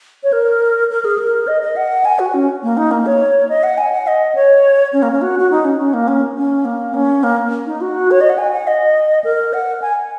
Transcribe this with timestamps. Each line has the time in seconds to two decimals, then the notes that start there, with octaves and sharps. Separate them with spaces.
0.23 C#5
0.32 A#4
0.91 A#4
1.04 G#4
1.18 A#4
1.47 D#5
1.62 D#5
1.76 F#5
2.05 G#5
2.19 F#4
2.34 C#4
2.63 A#3
2.77 D#4
2.91 A#3
3.06 C#5
3.49 D#5
3.63 F#5
3.78 G#5
3.92 F#5
4.07 D#5
4.35 C#5
4.93 C#4
5.02 A#3
5.12 C#4
5.22 F#4
5.39 F#4
5.51 D#4
5.65 C#4
5.79 C#4
5.94 A#3
6.08 C#4
6.37 C#4
6.65 A#3
6.94 C#4
7.23 A#3
7.66 D#4
7.81 F#4
8.11 C#5
8.21 D#5
8.29 F#5
8.38 G#5
8.53 F#5
8.67 D#5
9.24 A#4
9.53 F#5
9.82 G#5